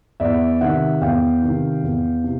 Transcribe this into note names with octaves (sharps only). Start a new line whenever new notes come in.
E2 D5 E5
C3 D#3 E5 F#5
E2 F5 G5
C3 D#3
E2
C3